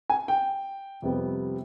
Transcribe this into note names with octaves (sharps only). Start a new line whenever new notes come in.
G#5
G5
F2 C3 G3 B3